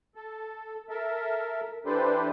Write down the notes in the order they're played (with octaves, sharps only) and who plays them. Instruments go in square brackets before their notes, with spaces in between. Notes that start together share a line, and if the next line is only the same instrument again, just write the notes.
[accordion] A4
A4 A#4 E5
E3 D4 G4 A4 B4 C5